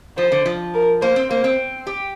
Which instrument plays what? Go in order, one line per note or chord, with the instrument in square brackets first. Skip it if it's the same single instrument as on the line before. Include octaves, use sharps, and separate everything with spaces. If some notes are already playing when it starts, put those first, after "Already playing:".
[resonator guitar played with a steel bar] F3 [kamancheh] C5
[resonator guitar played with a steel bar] D3
F3
[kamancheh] A#4
[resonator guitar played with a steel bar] A#3 [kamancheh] C5
[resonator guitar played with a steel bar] C4
[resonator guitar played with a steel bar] A#3 [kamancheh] C5
[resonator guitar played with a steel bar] C4
G4